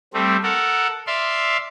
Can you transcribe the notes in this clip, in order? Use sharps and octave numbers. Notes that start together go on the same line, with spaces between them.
G3 A3 C4
A4 A#4 F#5
D5 E5 F5 C6